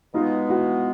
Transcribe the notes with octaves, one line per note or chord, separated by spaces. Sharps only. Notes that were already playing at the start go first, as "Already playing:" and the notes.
B2 G#3 B3 D#4 F4
E4 F#4